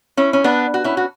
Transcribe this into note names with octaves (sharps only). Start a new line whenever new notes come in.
C#4 E4
C#4
B3 D4
F#4
C#4 E4
F#4